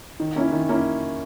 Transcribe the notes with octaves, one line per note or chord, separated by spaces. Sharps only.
D#3
A#3 C#4 E4
D#3
A#3 C#4 E4